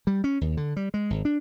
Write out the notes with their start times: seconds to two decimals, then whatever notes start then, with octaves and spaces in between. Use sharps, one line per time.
0.07 G3
0.24 C#4
0.41 D#2
0.57 D3
0.76 G3
0.94 G#3
1.10 G#1
1.25 D4